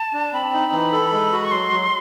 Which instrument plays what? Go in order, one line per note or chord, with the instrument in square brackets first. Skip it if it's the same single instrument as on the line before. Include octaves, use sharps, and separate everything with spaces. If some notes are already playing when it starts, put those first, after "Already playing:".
Already playing: [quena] A5
[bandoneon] D4
[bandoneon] C4 [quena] B5
[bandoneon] D#4
E3
A4
G#3
F#4
[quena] C#6
[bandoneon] F#3 [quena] C6
[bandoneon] F#3